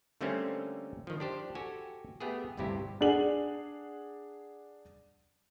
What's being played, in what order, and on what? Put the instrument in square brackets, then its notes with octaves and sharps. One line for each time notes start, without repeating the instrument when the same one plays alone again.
[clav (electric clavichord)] D3 G3 A3 A#3 C4 C#4
D#3 F3
D4 G4 C5
F#4 G4 A4 G#5
A3 B3 G4 G#4
G1 D2 G2 C3 E4 G4
[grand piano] D4 G#4 F#5 F#7